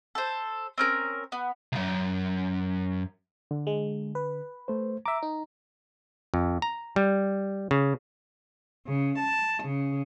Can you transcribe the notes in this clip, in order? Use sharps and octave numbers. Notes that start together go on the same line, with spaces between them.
A4 C5
C4 C#4 A#4
B3
C2 F#2
D3
G#3
B4
A3 C5
E5 A#5 D6
D#4
F2
A#5
G3
C#3
C#3
A5
C#3